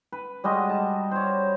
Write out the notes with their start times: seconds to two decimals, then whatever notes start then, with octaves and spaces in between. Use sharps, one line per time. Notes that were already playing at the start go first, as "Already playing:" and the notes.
0.12 B4
0.44 G3 G#3 F#4 D#5
0.69 A5
1.11 C5 C#5